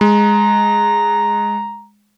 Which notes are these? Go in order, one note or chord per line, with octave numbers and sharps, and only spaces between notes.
G#3 A#5